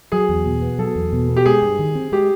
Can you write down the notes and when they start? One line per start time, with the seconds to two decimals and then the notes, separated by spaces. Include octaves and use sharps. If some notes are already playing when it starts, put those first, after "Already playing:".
0.12 F#3 G#4
0.29 E2
0.46 B2
0.62 B3
0.79 F#3 A4
0.96 E2
1.13 B2
1.29 B3
1.36 G4
1.45 G#3 G#4
1.62 G2
1.79 D#3
1.95 C4
2.12 G#3 G4